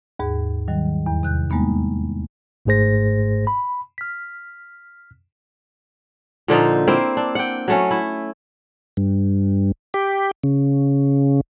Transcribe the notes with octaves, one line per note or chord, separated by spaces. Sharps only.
D#2 G#2 G#4
D#3 F#3 G3
E2
C3 F#6 G6
G3 G#3 A#3 B3 D#4
G#1 G#2 A3 G#4 C5 A#6
B5
F6 B6
A#2 D3 F3 D#4
A#3 C4 E4
D4
F#5 G5
F#3 A3 C#4
E4
G2
G4
C#3